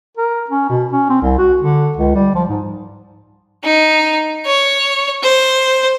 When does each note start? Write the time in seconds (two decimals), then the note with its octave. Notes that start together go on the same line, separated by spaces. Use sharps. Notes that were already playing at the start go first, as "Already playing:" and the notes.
0.17 A#4
0.49 C#4
0.70 B2
0.93 C#4
1.10 C4
1.22 C2
1.38 F#4
1.62 D3
1.97 C#2
2.15 G3
2.35 F3
2.49 G#2
3.64 D#4
4.46 C#5
5.23 C5